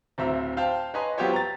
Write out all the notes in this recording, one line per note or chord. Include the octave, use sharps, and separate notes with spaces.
D1 C4 E5 A#5
C5 F5 G5 A5
B4 C#5 D#5 G#5 A#5 C6
F#3 B3 F4 G4 C5 C#5
A#5 A6